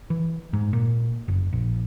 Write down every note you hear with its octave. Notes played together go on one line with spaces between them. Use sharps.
E3
G#2
A#2
F#1
A#1